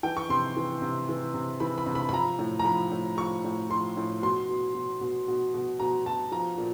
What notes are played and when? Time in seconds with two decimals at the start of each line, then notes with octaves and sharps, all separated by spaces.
0.03 E3 G5
0.17 C#6
0.29 C3 C6
0.57 E3
0.82 C3
1.09 E3
1.34 C3
1.60 E3 B5
1.78 B5
1.86 C3
1.95 B5
2.09 B5
2.13 F3 A#5
2.39 A2
2.59 A#5
2.65 F3 B5
2.91 A2
3.17 F3 C#6
3.44 A2
3.70 F3 C6
3.97 A2
4.22 B2 C6
4.49 B2
4.75 B2
5.01 B2
5.28 B2
5.54 B2
5.80 B2 A#5
6.05 B2 A5
6.32 F3 A#5
6.58 A#2